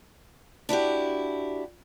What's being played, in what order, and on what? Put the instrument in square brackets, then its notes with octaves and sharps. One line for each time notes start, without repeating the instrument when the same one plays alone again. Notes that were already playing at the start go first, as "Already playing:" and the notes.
[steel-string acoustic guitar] D4 E4 F#4 G4